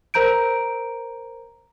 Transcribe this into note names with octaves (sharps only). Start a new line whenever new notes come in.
A#4 C5 A#5 G6 D7